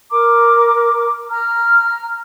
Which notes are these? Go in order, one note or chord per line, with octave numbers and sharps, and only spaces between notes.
A#4 A#5 D6
A#5 F6